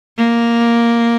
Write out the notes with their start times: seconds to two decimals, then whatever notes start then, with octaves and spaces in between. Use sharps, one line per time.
0.18 A#3